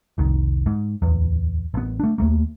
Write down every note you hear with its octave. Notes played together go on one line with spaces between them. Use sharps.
F1 C2 D#3
G#2
D1 E2
A1 B3
A3 D4
D#2 A3 A#3